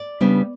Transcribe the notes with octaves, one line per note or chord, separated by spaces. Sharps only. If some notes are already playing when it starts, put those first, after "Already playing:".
Already playing: D5
C#3 G3 B3 D4